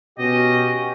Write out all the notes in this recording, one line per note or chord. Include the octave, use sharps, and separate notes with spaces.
B2 C#4 F#4 G4 D#5